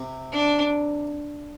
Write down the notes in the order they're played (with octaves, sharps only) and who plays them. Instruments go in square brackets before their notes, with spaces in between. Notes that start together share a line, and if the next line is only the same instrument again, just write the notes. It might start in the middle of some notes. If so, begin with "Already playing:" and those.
Already playing: [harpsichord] C3 C4
[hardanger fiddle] D4